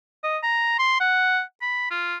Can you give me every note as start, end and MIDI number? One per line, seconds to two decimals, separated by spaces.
0.24 0.38 75
0.43 0.76 82
0.79 0.99 84
1.00 1.40 78
1.62 1.90 83
1.91 2.16 65